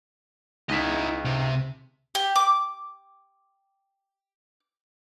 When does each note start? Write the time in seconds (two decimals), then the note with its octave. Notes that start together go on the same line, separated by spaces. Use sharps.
0.69 C#2 D#4 E4 D#5 B6
1.25 C3
2.15 G4
2.36 D6